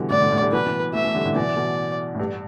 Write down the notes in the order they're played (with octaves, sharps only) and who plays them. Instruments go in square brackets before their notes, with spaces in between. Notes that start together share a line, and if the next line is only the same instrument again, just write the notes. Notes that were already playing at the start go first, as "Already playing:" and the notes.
Already playing: [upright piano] B2 D3 E3 G3
[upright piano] A2 D3 [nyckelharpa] D5
[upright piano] A2 D3
A2 D3
D3 G3
[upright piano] B2 E3 [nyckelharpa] B4
[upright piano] B2 E3
[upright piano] E3 A3 [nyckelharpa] E5
[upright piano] E3 A3
D3 G3
A2 D3
[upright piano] B2 E3 [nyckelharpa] D5
[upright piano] B2 E3
A2
G2